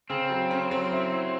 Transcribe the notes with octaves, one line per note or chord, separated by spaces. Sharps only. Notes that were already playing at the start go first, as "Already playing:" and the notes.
C#3 C4
F#3
C#4
F#3
E4
E4